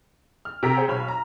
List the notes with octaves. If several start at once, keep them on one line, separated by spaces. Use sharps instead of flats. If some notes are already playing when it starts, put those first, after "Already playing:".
F6
C3 G4 A#4 A#5 B6
G#4 C5 F#5 G5
B1 C#5 B5 F6
A#5